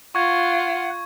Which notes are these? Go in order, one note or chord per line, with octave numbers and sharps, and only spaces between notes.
F4 F#5 C#6 G#6